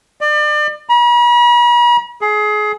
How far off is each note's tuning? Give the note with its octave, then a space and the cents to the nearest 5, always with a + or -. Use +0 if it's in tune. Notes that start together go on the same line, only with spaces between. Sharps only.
D5 +35
B5 -45
G#4 +25